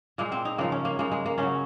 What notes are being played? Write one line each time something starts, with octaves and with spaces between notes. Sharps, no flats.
A#2 G#3 A#3
C4
D#4
C#3 F3 G#3 A#3
C#4
A#3
C#3 G#3 A#3
G#3
A#3
C#3 F#3 C#4